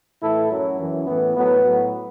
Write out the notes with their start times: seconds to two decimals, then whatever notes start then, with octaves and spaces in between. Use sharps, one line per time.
0.22 A2 E3 E4 A4
0.51 F#2 F#3
0.79 F#2 E3
1.07 A2 E3 B3
1.35 A2 F#3 B3
1.64 A2 F#3